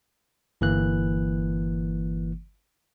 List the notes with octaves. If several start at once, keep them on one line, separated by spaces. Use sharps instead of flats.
G1 E3 A#3 F#6